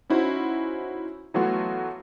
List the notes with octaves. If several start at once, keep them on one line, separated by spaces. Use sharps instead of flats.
C#4 D#4 E4 F#4 C5
E3 F#3 A3 B3 F4 F#4